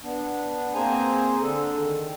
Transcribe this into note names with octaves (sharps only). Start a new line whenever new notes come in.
B3 D4
A#3 C4 G#4 C5 G#5 A#5
D3 D4 A4
D#3